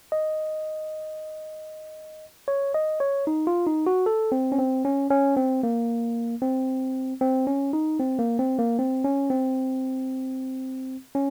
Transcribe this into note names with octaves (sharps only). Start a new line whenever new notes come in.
D#5
C#5
D#5
C#5
D#4
F4
D#4
F#4
A4
C4
C#4
C4
C#4
C#4
C4
A#3
C4
C4
C#4
D#4
C4
A#3
C4
A#3
C4
C#4
C4
C#4